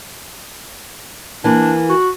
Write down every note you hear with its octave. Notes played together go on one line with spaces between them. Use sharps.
E3 A#3 D4
F#4